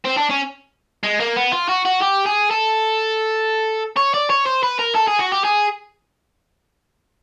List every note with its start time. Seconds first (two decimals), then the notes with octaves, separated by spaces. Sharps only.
0.05 C4
0.18 D4
0.30 C#4
1.03 G#3
1.20 A#3
1.36 B3
1.52 F4
1.68 F#4
1.85 F#4
2.01 G4
2.26 G#4
2.51 A4
3.97 C#5
4.14 D5
4.30 C#5
4.46 C5
4.63 B4
4.79 A#4
4.95 A4
5.07 G#4
5.19 F#4
5.32 G4
5.44 G#4